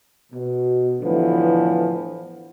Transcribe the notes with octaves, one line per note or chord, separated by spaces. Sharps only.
B2
A2 D3 E3 F3 B3